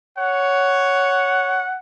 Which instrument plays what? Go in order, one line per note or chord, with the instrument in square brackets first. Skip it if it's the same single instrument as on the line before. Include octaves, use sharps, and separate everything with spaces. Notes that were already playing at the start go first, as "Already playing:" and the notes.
[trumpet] C#5 [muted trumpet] F#5